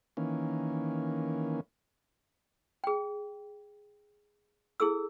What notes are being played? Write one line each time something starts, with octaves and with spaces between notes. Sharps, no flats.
D#3 E3 A#3 C#4
G#4 G5
E4 G#4 A4 E6